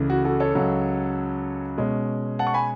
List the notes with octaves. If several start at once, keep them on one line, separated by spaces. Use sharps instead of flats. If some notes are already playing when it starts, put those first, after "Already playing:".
Already playing: C#2 C#3 E3 A3
F#4
F#4 A4
A4 C#5
C#2 C#3 F#3
B2 G#3 C#4
F#5 A5
C#6
G#5 B5